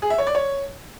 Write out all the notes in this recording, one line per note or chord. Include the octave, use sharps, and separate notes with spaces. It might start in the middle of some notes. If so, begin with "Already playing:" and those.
G#4
E5
C#5
D5
C#5